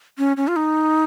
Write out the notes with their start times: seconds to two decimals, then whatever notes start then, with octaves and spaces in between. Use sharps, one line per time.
0.18 C#4
0.37 C#4
0.48 F4
0.56 D#4